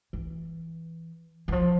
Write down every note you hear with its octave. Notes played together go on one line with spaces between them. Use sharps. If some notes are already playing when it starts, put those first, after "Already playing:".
E3
E3
F3